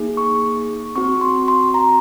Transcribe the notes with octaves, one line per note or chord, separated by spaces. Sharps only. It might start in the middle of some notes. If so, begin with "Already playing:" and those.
Already playing: A#3 D#4 G#4
C#6
C4 F#4 C#6
C6
C6
A#5